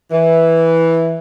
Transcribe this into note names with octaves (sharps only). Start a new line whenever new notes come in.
E3